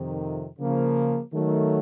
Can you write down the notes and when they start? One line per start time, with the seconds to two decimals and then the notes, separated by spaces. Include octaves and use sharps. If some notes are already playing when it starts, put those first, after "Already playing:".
Already playing: F2 C3 D#3
0.60 C#3 F3 A#3
1.32 D#3 F#3 A3